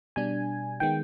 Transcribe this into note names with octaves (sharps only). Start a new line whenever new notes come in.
B2 G3 D4 G#5
D#3 G#3 B3 G5